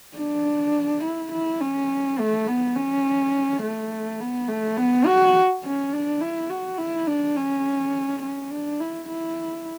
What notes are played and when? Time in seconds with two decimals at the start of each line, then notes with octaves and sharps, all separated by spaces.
0.17 D4
1.04 E4
1.32 E4
1.61 C#4
2.19 A3
2.47 B3
2.76 C#4
3.62 A3
4.20 B3
4.48 A3
4.77 B3
5.06 F#4
5.64 C#4
5.92 D4
6.21 E4
6.50 F#4
6.78 E4
7.07 D4
7.36 C#4
8.23 C#4
8.51 D4
8.80 E4
9.09 E4